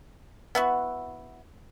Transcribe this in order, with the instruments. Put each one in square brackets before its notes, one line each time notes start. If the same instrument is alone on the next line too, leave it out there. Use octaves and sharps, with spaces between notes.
[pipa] B3 E4 F#4